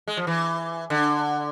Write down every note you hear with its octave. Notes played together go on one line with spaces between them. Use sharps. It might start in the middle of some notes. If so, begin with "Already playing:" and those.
G#3
F3
E3
D3